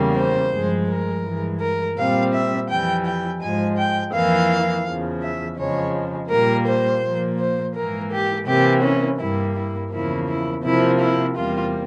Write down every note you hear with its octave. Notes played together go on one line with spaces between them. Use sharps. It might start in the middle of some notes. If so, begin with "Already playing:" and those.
Already playing: E2 C#3 G3 A#3
C5
G2 F3 G#3
A#4
G2 E3 G#3
A#4
A#2 G3 C4 F5
E5
F2 E3 G3 G5
G5
G#2 F3 G#3 G#5
G5
F2 E3 A#3 F5
E2 C#3 F3
E5
F2 C#3 F3 G#3 C#5
A#2 G3 A#3 A#4
C5
A#2 F3 A#3
C5
G#2 E3 A#3 A#4
G4
C3 E3 A#3 G4
C#4
G2 G3 A#3 E4
E4
E2 C#3 F3 A#3 E4
E4
C3 F3 A#3 E4
E4
E2 C3 G3 A#3 F4